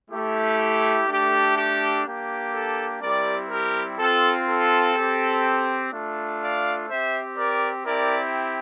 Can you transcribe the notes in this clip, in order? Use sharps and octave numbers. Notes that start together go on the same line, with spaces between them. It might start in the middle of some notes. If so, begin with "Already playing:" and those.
A3 E4 G4
A3 D4 G4
G4
A#3 D4 G4
A4
G3 C4 E4 G4 A#4 D5
G4 A#4
C4 F4 A4
A4
C4 G4
A3 D4 F4
D5 F5
C4 G4 C5 E5
A#4 D5
C4 E4 G4 A#4 D5